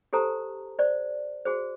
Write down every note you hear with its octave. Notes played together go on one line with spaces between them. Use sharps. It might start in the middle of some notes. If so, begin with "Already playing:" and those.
G4 A4 C5 A5 A#5
C5 D5
F#4 G#4 C5